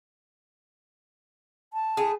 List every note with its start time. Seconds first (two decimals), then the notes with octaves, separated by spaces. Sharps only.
1.73 A5
1.97 A2 G#4